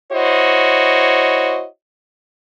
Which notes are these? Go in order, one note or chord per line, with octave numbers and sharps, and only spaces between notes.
E4 F#4 C5 C#5 D#5